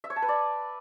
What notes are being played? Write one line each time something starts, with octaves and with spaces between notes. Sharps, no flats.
E5
C#5
A5
B4
D5